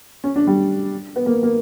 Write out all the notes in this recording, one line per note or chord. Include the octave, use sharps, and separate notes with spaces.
C#4
D4
G3
B3
A#3
A#3